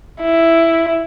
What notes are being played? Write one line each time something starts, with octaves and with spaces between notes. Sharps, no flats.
E4